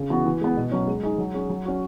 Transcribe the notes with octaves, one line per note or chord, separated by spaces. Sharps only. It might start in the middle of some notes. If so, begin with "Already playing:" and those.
Already playing: C#3
E3 B3 F#4
E3
G#3 B3
B2
F#3 C#4
G#3
D#4 G#4
F#3
C#4 G#4
F#3
C#4 F#4